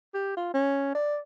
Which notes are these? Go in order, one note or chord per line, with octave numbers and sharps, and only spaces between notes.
G4
F4
C#4
D5